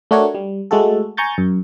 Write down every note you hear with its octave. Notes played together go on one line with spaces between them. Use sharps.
A3 D4 F#4 A#4 C#5
G3
G#3 A3 F#4 A4
G#5 A#5 C#6 G6 A6
F#2